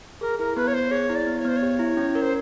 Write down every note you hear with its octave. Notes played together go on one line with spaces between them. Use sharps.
G#4 A#4
E4 A#4
B3 B4
C#5
B3 C5
G#4 C#5
E4
D5
B3
C#5
B3 C5
C#5
G4
E4
C#4
A#4
C5